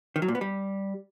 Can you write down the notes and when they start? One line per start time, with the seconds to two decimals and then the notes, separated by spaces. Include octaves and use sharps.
0.16 D#3
0.22 F#3
0.28 A#2
0.35 B3
0.41 G3